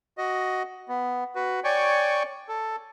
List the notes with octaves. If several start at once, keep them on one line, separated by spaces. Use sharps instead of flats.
F#4 D#5
B3
F#4 B4
C#5 D5 G5 G#5 C#6
A4